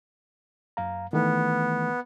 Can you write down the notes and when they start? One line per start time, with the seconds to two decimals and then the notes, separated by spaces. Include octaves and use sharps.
0.77 F#2 F5 A#5
1.13 D#3 E3 A3 B3